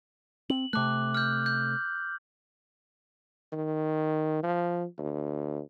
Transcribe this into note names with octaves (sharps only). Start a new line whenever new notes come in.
C4 F#7
C3 A3 D6 F#6
F6 G6
G6
D#3
F3
D2